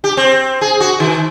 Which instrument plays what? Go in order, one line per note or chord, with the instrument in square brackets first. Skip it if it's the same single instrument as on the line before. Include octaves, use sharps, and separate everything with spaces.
[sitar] G4
C4
G#4
F#4
D#3